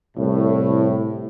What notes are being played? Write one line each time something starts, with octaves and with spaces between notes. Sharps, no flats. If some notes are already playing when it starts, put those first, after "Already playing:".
C2 A2